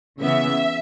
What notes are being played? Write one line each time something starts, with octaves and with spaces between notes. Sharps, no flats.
C#3 E3 B3 E5